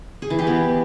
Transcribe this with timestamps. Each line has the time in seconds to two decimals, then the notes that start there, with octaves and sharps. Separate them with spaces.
0.22 G#4
0.30 E3
0.39 G4
0.47 B3